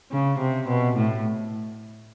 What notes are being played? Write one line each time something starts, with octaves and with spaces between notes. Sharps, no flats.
C#3
C3
B2
A2